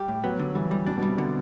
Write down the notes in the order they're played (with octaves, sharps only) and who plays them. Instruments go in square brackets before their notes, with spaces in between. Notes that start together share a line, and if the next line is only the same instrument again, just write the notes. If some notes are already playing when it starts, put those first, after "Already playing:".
Already playing: [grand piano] G3 [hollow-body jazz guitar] G4
[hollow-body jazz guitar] A2
[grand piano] F#3 [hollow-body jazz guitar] B3
[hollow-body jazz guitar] D3
[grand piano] E3 [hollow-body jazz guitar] G3
[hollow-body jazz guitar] G3
[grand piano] B2 [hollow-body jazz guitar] D4
[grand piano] B2
[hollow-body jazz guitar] G3
[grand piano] C3
[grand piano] B2 [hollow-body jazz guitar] D3